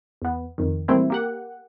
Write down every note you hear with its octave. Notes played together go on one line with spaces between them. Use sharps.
E2 B3
F2 D#3
A#2 E3 G3 A3 C4 E4
A#3 G4 F#5